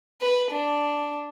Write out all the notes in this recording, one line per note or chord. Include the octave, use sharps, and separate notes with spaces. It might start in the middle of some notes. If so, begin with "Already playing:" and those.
B4
D4